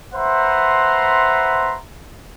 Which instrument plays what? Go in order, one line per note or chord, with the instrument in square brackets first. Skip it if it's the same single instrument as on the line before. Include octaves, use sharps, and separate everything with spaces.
[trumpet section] B4 C5 E5 F#5 A#5 C6